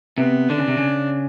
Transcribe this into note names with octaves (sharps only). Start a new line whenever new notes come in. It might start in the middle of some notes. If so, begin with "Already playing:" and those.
C3 B3
D3 D4
C#3
C3
C#3